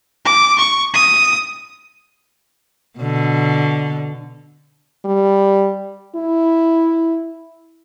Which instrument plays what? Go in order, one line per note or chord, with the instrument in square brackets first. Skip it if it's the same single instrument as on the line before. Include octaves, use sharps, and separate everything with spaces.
[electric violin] D6
C#6
D#6
[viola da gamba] B2 D3
[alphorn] G3
E4